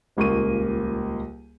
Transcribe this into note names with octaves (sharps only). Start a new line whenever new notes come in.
D#1 C#2 A#3 C#6 D#7